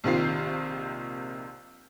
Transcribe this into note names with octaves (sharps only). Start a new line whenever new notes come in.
A#1 C3 D#3 C4 F4 C7